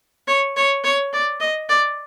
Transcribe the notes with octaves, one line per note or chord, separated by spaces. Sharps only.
C#5
C#5
C#5
D5
D#5
D5